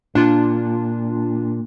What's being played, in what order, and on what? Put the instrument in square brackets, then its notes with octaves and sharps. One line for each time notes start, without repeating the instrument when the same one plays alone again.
[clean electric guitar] A#2 [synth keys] D4 F4